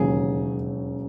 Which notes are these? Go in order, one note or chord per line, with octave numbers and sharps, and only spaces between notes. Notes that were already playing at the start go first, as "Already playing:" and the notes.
Already playing: E1 D#2 C#3 F#3 G#4